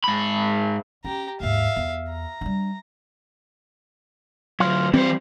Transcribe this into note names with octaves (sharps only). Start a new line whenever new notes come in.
G#2 B5
C#4 G4 A#5
D#2 G#2 E5 F5
E2
A#5
G3 D4
D3 F#3 F4
E3 G3 C4 C5